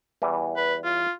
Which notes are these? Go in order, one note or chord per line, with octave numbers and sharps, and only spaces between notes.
E2 E3 G3
B4
F4